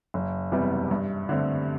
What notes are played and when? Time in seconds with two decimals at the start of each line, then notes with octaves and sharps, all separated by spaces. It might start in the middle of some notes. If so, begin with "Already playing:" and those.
0.14 F#1
0.52 E2 C3 G3 B3
0.91 G2
1.29 D3 A3 C4